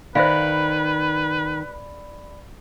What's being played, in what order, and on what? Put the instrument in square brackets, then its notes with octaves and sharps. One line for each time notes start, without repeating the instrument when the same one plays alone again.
[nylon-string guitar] D#3 [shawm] B4 [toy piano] C5 E5 F5 [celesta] D5 B5